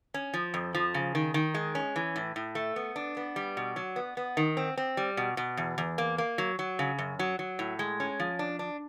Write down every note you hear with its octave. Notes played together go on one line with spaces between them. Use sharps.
C#4
F3
F2
F3
C#3
D#3
D#3
G#3
C#4
E3
A2
A2
A3
B3
D4
B3
G3
B2
F#3
B3
B3
D#3
C4
C4
G3
B2
B2
E2
E2
A#3
A#3
F#3
F#3
C#3
F#2
F#3
F#3
A2
G#3
C#4
F3
D4
D4